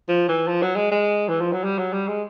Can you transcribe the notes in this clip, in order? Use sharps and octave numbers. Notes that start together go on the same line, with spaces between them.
F3
E3
F3
F#3
G#3
G#3
E3
F3
F#3
G3
F#3
G3
G#3